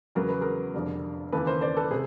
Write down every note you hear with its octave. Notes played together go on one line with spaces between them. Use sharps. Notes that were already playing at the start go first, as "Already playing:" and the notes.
E2 C#3 F#3 B3 A#4
B4
G#4 A#4
F1 F2 D3 G3
D#2 C#3 E3 A4 B4
A#4 C5
C5 D5
A4 B4
C3 G#4